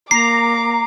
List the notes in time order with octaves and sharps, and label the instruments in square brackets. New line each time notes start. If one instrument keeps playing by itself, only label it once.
[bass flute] A#3 [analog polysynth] A#5 [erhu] D6 [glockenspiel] C7